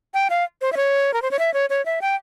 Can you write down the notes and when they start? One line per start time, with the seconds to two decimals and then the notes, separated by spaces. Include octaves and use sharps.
0.14 G5
0.30 F5
0.61 C5
0.72 E5
0.77 C#5
1.14 A#4
1.22 C5
1.31 C#5
1.39 E5
1.54 C#5
1.70 C#5
1.85 E5
2.02 G5